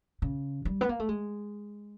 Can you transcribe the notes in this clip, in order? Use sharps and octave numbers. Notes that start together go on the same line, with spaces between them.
C#3
G3
B3
A#3
A3
G#3